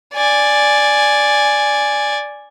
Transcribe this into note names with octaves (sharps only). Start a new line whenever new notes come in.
D5 G#5